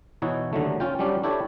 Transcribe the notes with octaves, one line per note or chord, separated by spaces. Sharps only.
B2 E3 D#4 E4 C#5 F#5
D#2 D3 F#3 A3
C#4 F4 G5
F#3 G3 C#4 D4 G4
D4 E4 G4 A4 C#5